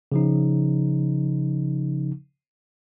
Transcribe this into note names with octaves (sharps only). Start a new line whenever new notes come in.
C#3 F3 D#4